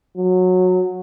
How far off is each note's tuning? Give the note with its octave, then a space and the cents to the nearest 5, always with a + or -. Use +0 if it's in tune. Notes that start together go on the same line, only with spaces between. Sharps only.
F#3 -15